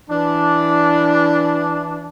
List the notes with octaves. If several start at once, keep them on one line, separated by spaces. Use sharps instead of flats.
E3 D4